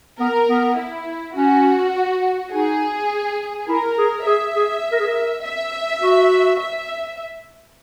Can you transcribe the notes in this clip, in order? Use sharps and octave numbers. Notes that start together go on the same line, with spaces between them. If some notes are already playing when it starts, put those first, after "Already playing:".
B3 A#4
B3
E4
C#4 F#4
D#4 G#4
E4 A#4
G#4
G#4 E5
G#4
A#4
G#4
A#4
E5
F#4
E5